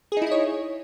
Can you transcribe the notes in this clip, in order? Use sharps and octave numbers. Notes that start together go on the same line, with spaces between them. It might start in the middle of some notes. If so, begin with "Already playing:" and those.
D#4 E4 G#4 C#5 D#5